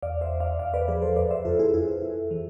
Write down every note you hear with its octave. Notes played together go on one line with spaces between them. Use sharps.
E2 D5 F5
C5 E5
E2
D5 F5
E2 D5 F5
B4 D5
F3 G#4 B4
A4 C5
F2 B4 D5
C5 E5
F2 F4 A4
E4 G#4
F2 E4 G#4
F2
E3